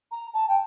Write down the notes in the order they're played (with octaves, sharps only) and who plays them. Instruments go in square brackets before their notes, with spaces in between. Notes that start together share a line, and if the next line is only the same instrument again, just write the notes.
[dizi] A#5
A5
G5